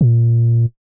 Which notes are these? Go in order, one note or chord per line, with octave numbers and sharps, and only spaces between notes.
A#2